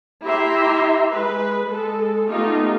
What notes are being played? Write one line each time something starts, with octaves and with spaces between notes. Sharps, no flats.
E4 G4 E5 A#5 C6
G#3 B4
G#3 A4
A3 B3 D#4 F4 G4 A4